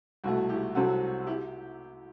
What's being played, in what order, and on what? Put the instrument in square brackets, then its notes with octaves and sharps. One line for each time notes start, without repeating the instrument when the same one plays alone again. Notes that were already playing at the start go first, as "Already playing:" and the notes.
[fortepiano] C2 B2 A3 F#4
E4 G4
C2 C3 F#3 C4 F#4 A4
E4 G4